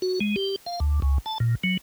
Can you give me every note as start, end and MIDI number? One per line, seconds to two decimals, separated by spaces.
0.02 0.19 66
0.20 0.36 56
0.36 0.56 67
0.66 0.80 77
0.80 1.00 38
1.02 1.18 37
1.26 1.38 81
1.40 1.55 46
1.64 1.77 54